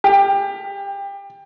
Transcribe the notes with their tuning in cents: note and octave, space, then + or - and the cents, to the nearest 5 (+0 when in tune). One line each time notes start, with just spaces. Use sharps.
G4 +25